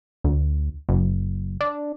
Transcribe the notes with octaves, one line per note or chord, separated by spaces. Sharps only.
D2
F#1
D4